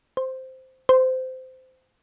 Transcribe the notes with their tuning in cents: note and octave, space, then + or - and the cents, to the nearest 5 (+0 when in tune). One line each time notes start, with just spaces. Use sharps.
C5 -5
C5 -20